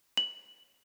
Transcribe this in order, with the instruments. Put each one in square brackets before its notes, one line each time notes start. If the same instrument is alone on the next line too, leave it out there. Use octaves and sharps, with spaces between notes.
[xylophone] F#7